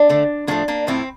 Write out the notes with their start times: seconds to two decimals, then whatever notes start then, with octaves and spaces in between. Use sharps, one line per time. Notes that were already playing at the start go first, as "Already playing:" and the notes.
Already playing: D4
0.09 D3 A3
0.47 A2 F3 A3 A#3 D4
0.68 A#3 D4
0.87 A2 F3 A3 C4 E4